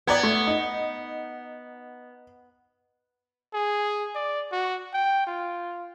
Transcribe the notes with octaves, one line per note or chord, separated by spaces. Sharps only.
B3 D5 A#5 G#6
A3
D#4
G#4
D5
F#4
G5
F4